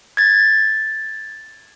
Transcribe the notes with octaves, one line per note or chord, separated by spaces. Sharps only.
G#6 A6